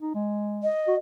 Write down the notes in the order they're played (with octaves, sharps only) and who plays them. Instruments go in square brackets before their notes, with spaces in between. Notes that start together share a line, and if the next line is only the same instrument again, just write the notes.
[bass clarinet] D#4
G#3
[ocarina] D#5
[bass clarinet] F#4